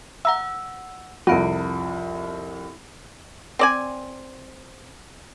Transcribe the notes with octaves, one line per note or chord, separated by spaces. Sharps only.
E5 F#5 A#5 E6
C2 F2 F4 F#4 F5 B5 D7
C4 D5 G#5